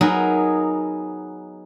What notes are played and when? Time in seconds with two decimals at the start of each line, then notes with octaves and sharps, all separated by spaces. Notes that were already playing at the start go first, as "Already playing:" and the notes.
0.01 F#3 B3 D#4 G#4 A#4